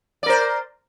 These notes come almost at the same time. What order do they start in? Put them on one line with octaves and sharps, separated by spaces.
D5 A#4 C5